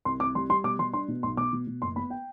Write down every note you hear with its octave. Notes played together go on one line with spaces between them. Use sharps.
C2 C6
C2 D6
G3 C6
G3 C6
B2 D6
G3 C6
D4 C6
B2
B1 C6
B2 D6
B2
B2
F#1 C6
B3 B5
G5